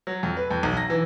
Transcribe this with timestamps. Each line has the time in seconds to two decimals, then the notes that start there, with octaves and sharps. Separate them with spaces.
0.07 F#3
0.23 F2
0.37 B4
0.51 F2
0.63 B1
0.77 A#6
0.90 E3